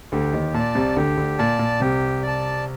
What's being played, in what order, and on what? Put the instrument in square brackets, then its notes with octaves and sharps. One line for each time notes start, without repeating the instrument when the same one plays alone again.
[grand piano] D2 D3 [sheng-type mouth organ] G4
[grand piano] D#2 D#3
[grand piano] A#2 [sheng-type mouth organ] D5 A5
[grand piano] C2 C3
[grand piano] D2 D3 [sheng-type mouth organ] G4
[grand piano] D2 D3
[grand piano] A#2 [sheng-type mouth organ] D5 A5
[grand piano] A#2
[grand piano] C2 C3 [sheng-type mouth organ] G4
[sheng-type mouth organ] D5 A5